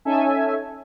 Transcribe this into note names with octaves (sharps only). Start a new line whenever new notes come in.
C#4 D#4 A4 E5 G#5